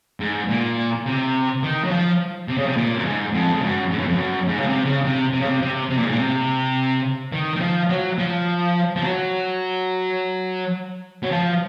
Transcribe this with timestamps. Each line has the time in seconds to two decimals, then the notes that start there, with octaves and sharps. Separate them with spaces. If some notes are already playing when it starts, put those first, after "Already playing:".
0.20 G#2
0.49 A#2
1.06 C3
1.63 D#3
1.84 F#3
1.91 F3
2.48 C3
2.58 C#3
2.67 C3
2.76 A#2
2.95 F#2
3.05 G#2
3.34 F2
3.53 G#2
3.62 F#2
3.91 G#2
3.98 F#2
4.07 F2
4.15 F#2
4.48 G#2
4.58 C#3
4.67 C3
4.85 C#3
5.04 C3
5.33 C3
5.41 C#3
5.48 C3
5.62 C3
5.89 C3
5.97 A#2
6.03 G#2
6.11 A#2
6.19 C3
7.32 D#3
7.56 D#3
7.61 F3
7.89 F#3
8.18 F3
8.96 F3
9.04 F#3
11.23 F#3
11.31 F3